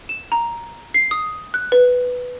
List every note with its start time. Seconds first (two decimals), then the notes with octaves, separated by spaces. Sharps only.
0.09 E7
0.32 A#5
0.94 C7
1.11 D#6
1.54 F#6
1.72 B4